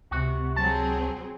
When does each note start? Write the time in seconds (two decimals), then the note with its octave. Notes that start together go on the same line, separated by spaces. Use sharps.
0.11 C#2 C3 F#4
0.56 F#3 C4 G#4 A5